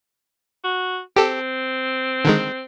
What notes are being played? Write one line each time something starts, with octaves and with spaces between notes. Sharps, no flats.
F#4
C4 G4 A4
D3 D#3 G#3